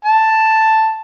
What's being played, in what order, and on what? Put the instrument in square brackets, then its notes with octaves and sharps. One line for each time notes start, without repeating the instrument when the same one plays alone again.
[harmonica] A5